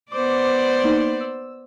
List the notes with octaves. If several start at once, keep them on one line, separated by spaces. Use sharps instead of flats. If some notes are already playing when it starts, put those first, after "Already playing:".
B3 C5 D5 D6
A#3 D#4
E6